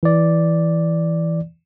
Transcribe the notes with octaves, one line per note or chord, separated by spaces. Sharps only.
E3 D5